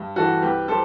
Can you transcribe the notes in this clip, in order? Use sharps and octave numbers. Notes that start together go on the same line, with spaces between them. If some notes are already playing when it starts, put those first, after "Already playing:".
Already playing: G2
E3 G3 F#4 A4
C2 G4 B4
G3 A4 C5